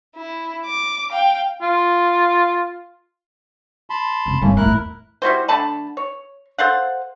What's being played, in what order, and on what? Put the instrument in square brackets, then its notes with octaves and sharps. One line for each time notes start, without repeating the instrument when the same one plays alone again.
[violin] E4
D6
F5 G5
[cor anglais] F4
[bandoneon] A5 B5 C6
[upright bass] F1 C#3
[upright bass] G#1 G3 [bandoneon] A3 A#3 C#4
[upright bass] E2 A2 [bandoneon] E4 A#4 F#6
[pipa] G3 E4 F#4 C5
D3 A3 A5 B5
C#5
A4 C5 F5 F#5